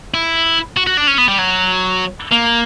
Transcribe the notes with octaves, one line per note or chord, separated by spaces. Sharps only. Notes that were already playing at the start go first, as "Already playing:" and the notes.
E4
F#4
F#4
D4
C#4
B3
G3
F#3
A#3